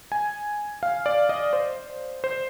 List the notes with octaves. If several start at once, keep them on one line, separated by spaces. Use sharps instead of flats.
G#5
F5
D5
D#5
C5
C5